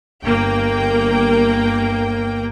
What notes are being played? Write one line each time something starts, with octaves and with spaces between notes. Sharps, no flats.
G1 A#3 G5